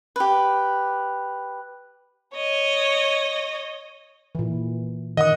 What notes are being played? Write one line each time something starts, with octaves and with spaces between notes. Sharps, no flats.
G4 B4
C#5 D#5
A#2 E3
D#3 D#5 F#5 D#6